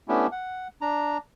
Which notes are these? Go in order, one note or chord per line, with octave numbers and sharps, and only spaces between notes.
A3 B3 C#4 D4 E4 G4
F#5
D4 A#5